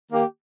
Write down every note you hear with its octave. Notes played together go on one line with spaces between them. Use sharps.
D#3 A#3 G4